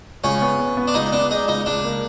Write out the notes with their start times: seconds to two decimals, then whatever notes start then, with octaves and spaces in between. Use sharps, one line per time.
0.24 C#2 C#4
0.42 B3
0.59 B3
0.77 B3
0.88 D4
0.94 C#2 D#4
1.12 B3 D4
1.30 G#3 D#4
1.48 C#2 D#4
1.66 C#2 D4
1.84 A#3